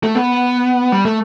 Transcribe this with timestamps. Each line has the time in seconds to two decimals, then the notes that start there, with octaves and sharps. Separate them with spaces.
0.03 A3
0.15 B3
0.92 G3
1.05 A3